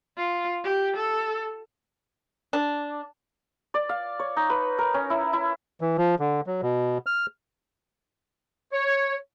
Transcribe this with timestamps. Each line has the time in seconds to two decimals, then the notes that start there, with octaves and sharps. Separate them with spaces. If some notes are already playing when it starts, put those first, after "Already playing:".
0.17 F4
0.64 G4
0.96 A4
2.53 D4
3.74 D5
3.89 F5
4.19 C#5
4.37 D#4
4.50 B4
4.78 A#4
4.94 C#4
5.10 E4
5.33 E4
5.81 E3
5.98 F3
6.19 D3
6.47 F#3
6.62 B2
7.06 F6
8.73 C#5